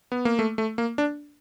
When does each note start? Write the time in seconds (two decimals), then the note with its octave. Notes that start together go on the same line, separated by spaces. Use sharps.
0.12 B3
0.25 A#3
0.39 A3
0.58 A3
0.78 A#3
0.98 D4